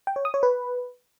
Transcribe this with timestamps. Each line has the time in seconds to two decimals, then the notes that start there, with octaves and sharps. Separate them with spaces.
0.07 G5
0.16 C#5
0.25 D#6
0.34 C#5
0.43 B4